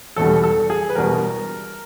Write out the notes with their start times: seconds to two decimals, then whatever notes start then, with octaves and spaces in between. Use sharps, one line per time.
0.16 E1 E2 B2 G3 A4
0.44 A4
0.70 G#4
0.89 B4
0.95 E1 E2 B2 G3 A#4